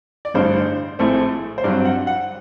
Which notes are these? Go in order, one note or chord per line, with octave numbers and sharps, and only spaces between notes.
D5
A1 G2 D3 C5
A#1 A2 A3 C4
C5
G2 F#3 C4 D5
F#5
F#5